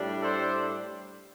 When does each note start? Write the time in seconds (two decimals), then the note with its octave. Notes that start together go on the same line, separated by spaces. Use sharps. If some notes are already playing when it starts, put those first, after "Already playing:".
Already playing: A2 G3 D4
0.21 A4 C5